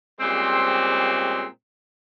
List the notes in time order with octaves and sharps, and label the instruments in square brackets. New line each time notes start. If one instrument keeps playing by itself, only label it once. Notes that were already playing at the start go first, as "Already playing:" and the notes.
[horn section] A#2 C#3 G3 G#3 C4